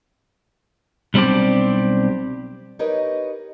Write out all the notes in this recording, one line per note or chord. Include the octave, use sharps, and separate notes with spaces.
B1 G3 C4 D4 G4
D#4 G4 A#4 B4 C#5 D#5